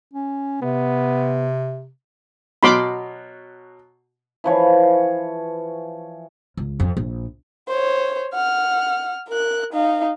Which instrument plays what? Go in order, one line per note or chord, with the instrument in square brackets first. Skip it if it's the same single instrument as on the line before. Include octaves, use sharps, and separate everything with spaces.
[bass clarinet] C#4
[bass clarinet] C3 [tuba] B3
[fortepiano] B2 F#3 F6 [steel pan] B5 C6 D6
[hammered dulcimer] E3 F3 C#5
[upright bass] C#2
F2
A#1
[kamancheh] C5 C#5
F#5 F6
A#4 F#6
D#4 F5